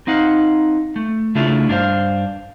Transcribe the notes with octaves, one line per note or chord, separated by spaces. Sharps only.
C4 D#4 F5 F#5
A3
C#3 A3 D4 E4 F4 G#4
G2 D4 E4 A#4 C5 F5